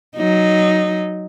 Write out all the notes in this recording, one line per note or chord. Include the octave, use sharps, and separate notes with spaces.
F#3 D#4